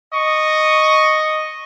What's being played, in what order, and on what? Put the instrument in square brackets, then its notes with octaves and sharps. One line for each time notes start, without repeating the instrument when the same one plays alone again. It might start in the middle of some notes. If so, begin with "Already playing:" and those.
[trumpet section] D#5 C#6